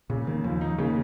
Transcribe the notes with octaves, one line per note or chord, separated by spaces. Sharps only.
A#2 C#3
D#3 A#3
D#2 F3
F3 D#4
C#3 A#3